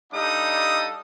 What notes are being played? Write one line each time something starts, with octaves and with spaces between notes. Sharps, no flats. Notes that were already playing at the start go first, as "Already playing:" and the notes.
G3 D4 D#4 A4 F5 D#6